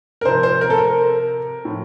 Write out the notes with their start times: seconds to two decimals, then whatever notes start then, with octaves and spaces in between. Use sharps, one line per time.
0.21 A#4
0.25 C3 F3 C5
0.43 C5
0.61 A#4
0.70 A4
0.78 A#4
1.65 A2 F3